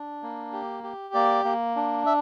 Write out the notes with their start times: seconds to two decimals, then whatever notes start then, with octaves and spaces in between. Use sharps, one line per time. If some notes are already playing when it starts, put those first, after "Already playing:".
Already playing: D4
0.23 A#3
0.53 G4
0.84 G4
1.14 A#3 D5
1.45 A#3
1.76 D4
2.06 E5